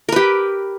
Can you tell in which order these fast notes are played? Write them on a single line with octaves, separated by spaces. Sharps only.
A#4 B4 G4